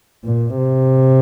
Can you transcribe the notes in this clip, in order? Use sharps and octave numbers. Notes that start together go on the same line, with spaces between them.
A#2
C3